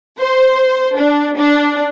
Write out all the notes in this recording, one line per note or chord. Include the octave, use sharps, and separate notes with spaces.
C5
D4
D4